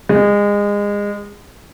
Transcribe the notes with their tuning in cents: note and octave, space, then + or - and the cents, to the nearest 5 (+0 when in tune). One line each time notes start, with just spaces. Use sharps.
G#3 -25